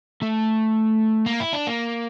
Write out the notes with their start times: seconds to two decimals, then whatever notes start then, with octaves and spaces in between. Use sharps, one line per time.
0.22 A3
1.26 A#3
1.40 E4
1.53 D4
1.67 A#3